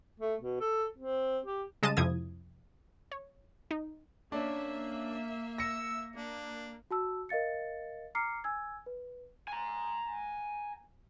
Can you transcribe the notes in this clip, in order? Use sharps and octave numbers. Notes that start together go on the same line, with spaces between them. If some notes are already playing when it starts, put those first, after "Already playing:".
A3
B2
A4
C4
G4
C#3 G3 G#3 D#5 A5 D#7
F2 C3 F3 E4 D#6 G#6
C#5
D#4
A#3 C#4 D4 E5
E6 A#6 C#7
A#3 D4
F#4 A5 E6
A#4 D#5 F5 A6 C#7
A#5 D6 F6 C7 C#7
G#5 E6 G#6
B4
G#5 A#5